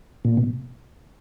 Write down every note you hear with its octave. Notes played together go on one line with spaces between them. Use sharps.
A#2
B2